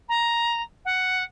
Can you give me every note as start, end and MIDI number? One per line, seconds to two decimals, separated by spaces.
0.08 0.61 82
0.85 1.23 78